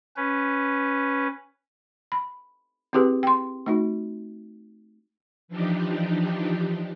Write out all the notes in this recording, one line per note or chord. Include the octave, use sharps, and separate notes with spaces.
C#4 B4
B5
C4 E4 G4 G#4 B4
G5 C6
A3 D#4 F#4
E3 F3 D4 D#4 G4